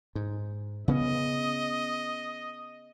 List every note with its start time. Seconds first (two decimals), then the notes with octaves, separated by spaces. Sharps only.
0.15 G#2
0.88 C#3 B3 C#4 D#5